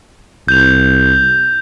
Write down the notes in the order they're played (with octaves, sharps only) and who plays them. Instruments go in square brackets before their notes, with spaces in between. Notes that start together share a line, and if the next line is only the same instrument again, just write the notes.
[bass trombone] C2 [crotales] G6 F7